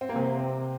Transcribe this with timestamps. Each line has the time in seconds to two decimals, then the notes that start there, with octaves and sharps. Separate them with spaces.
0.01 C4
0.09 A#3
0.16 C3 C4